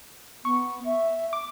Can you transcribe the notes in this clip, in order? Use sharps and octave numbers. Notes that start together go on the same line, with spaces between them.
B3 C#6
E5
D6